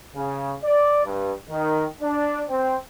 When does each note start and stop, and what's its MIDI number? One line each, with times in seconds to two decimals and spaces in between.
0.15 0.54 49
0.63 1.03 74
1.04 1.31 43
1.49 1.84 51
2.01 2.42 62
2.48 2.75 60